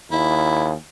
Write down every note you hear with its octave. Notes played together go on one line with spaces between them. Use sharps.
D#2 E4